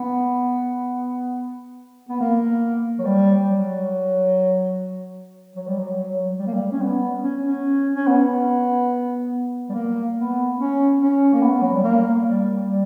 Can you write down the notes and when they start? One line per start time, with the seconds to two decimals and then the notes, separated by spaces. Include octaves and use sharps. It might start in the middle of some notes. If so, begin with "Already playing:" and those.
Already playing: B3
2.09 B3
2.20 A#3
2.99 F#3
3.05 G3
3.46 F#3
5.56 F#3
5.67 G3
5.78 F#3
5.97 F#3
6.39 G3
6.47 A#3
6.54 G3
6.72 C#4
6.81 B3
7.23 C#4
7.45 C#4
7.94 C#4
8.07 B3
9.69 G3
9.74 A#3
10.16 B3
10.59 C#4
11.00 C#4
11.33 A#3
11.42 B3
11.61 F#3
11.73 G3
11.84 A#3
12.26 G3
12.67 G3